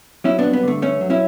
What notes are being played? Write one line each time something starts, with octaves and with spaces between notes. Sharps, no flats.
F#3 C#4 E4
B3 D4
G2
B3
D3 A3
G2 A3 C#4
F#3
C#4 E4